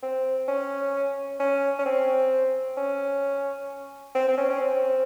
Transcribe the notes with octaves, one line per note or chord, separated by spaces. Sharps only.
C4
C#4
C#4
C#4
C4
C#4
C4
C4
C#4
C#4
C4